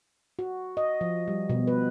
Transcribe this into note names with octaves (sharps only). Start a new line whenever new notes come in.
F#4
D#5
F3
G3
B2
B4